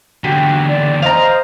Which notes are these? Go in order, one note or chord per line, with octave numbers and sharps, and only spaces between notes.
E2 D3 F#4 G4
D5
C5 D#5 F5 A#5